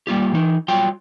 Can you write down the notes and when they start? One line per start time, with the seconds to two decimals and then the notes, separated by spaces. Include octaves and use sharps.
0.07 G3 A#3 F4 G4
0.33 E3 D#4
0.68 F#3 G3 F4 G5